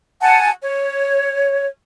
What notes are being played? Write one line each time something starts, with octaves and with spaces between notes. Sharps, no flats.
F#5 G#5 A5
C#5